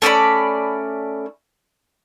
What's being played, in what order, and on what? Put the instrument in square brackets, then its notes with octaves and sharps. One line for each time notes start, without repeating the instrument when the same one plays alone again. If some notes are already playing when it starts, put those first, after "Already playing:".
[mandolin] A3 C#4 D5 B5